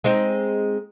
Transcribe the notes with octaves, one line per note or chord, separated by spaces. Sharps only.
G#3 C4 D#4